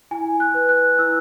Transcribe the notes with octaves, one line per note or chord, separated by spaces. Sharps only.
E4 G#5
F#6
B4
F#6
E4 E6